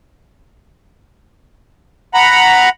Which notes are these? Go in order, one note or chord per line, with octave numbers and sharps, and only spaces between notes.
F#5 A#5 B5